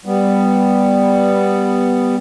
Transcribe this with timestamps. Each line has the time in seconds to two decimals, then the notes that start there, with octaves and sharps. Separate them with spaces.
0.05 G3 B3